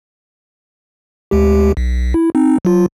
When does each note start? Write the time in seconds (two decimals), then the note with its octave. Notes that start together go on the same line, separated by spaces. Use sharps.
1.31 D2 G#3 G4
1.77 B1
2.14 E4
2.35 C4 D#4
2.65 F#3 F4